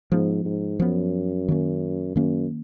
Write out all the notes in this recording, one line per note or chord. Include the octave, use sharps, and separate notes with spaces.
G#2 F3 B3
G#2
F#2 F3 B3
D#3 A#3 C#4
F#2 D#3 A#3 C#4